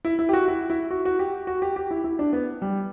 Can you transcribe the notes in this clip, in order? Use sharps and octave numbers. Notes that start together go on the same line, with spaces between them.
E4
E4
G4
F#4
E4
E4
F#4
F#4
G4
F#4
G4
G4
E4
E4
D4
B3
G3